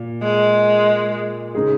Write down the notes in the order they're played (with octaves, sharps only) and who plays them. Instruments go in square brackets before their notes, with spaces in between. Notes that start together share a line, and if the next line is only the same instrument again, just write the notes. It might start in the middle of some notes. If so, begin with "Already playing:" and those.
Already playing: [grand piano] A#2
[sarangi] G#3
[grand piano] C#3 G#3 D#4 G#4